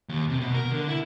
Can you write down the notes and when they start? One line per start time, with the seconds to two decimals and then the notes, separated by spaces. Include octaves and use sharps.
0.09 D#2
0.29 C3
0.40 B2
0.55 A#4
0.71 D3
0.88 E4